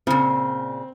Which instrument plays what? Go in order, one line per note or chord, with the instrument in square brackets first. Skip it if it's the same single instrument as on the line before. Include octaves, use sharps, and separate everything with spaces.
[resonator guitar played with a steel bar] A#2 C#3 [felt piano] C4